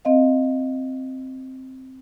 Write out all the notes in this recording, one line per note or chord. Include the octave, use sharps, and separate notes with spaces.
C4 D#5 F5